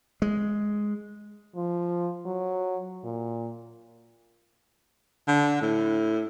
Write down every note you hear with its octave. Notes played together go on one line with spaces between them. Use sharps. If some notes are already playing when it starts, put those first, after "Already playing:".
G#3
F3
F#3
A#2
D3
A2